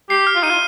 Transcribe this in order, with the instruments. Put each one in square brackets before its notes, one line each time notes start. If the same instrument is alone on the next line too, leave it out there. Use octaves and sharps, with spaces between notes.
[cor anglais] G4 [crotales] C7
[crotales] F6
[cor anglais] F4
[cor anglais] D#4 [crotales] D#7
[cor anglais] F4